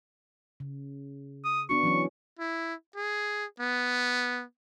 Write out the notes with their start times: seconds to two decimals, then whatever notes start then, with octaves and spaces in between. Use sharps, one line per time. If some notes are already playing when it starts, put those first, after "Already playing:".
0.60 C#3
1.44 D#6
1.69 B3 D4 F#4 C#6
1.83 E3 F#3 C#4
2.39 E4
2.96 G#4
3.60 B3